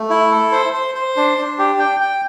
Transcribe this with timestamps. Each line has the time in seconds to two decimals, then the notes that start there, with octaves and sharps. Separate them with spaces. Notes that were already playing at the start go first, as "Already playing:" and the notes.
Already playing: A3
0.10 E4
0.31 A4
0.52 C5
0.73 C5
0.95 C5
1.16 D4
1.38 D4
1.58 G4
1.79 G5
2.00 G5